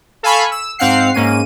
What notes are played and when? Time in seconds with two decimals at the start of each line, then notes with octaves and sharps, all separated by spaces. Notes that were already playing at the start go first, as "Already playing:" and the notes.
0.23 A4 F5 G#5 B5 C#6
0.51 E6
0.79 G#2 C4 F5 F#5 C7
1.14 G#2 A#3 C#4 D#7